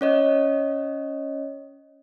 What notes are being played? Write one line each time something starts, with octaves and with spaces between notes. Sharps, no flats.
C#4 C#5 D#5